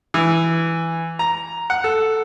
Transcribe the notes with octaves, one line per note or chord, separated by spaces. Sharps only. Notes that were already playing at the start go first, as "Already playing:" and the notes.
E3
A#5
F#5
A4